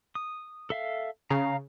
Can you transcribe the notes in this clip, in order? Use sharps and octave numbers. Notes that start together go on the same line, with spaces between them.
D#6
A4 E5 F5
C#3 F5 A#5